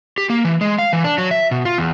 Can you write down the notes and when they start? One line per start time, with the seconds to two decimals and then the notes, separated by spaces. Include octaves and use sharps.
0.18 G4
0.30 A#3
0.45 E3
0.61 G#3
0.79 F5
0.93 E3
1.04 D4
1.18 F#3
1.31 E5
1.51 B2
1.65 F4
1.78 E2